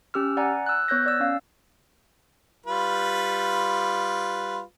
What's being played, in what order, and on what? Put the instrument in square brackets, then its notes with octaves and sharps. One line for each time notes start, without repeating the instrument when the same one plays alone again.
[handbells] C#4 G4 E6 F6
D5 F#5 G#5 A#5
E6 F#6
B3 C#5 F#6 G6 A#6
D5 E6
C#4 F5
[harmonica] G3 F4 B4